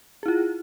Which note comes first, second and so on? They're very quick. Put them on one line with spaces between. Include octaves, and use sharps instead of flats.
G#4 E4 F4